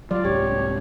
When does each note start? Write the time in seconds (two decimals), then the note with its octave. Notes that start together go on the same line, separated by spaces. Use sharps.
0.11 F#3 G3 F4 D5
0.25 C2 G#2 G4 C#5